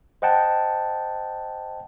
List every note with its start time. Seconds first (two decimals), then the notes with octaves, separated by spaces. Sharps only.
0.22 C5 D#5 F#5 G5 A5